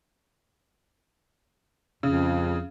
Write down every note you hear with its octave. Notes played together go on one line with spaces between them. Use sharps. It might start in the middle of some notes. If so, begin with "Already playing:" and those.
F2 C#3